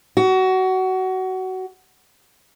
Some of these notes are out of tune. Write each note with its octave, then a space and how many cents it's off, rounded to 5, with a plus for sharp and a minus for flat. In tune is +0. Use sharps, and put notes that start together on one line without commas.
F#4 +20